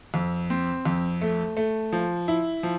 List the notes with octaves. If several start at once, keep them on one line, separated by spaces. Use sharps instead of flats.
F2
C4
F2
A3
A3
F3
E4
F3